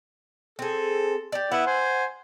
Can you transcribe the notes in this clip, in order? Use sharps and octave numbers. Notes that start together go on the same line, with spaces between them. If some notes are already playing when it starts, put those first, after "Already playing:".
C4 G#4 A4
G4 D5
B3 E4 F#5
C5 G#5